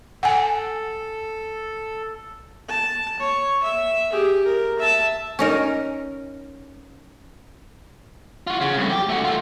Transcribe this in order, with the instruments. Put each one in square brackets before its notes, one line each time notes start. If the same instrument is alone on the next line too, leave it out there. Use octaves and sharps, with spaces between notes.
[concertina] A4 [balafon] F#5 G#5
[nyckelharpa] A5
C#5
E5
G4 G#4
A#4
E5 A5
[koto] C#4 D#4 A#4
[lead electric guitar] F4 F#4
C#3
C2 A2
G4
A3 F#4
A3 F4